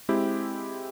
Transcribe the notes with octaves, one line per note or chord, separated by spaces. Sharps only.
G#3 C4 E4 G4